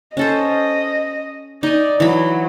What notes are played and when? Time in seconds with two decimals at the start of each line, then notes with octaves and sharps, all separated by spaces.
0.17 C#4 A4 C5 D#5
1.63 D#4 D5 G#5
2.00 E3 F#3 B5